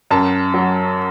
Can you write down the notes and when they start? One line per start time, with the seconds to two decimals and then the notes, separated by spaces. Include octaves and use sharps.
0.11 F#2 A5
0.54 F#3